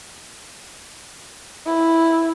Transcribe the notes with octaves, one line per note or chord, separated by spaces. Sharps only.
E4